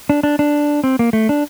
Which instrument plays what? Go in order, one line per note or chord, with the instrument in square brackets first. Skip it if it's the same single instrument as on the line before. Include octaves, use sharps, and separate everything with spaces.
[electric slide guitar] D4
D4
D4
C4
A#3
A3
D4